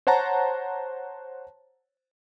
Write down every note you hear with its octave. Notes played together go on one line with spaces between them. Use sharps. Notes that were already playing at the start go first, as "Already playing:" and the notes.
C5 C#5 F#5 A5 A#5